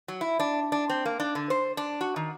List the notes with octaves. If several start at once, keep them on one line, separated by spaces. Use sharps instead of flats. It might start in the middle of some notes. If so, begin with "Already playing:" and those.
F#3
E4
D4
D4
C4
A#3
D4
D3
C5
D4
F#4
D#3